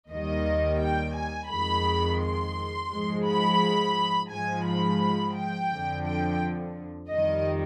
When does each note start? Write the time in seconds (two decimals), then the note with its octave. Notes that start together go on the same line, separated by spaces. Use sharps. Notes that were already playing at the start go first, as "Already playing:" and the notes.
0.10 D#2 D#3 G3 D#5
0.81 G5
1.16 G#5
1.50 F2 D#3 G#3 B5
2.21 C6
2.91 G#2 F3 G#3
3.26 B5
4.31 G#2 F3 G#3 G#5
4.65 B5
5.35 G5
5.70 F2 D3 F3
6.04 G5
7.09 F2 D#3 G3 D#5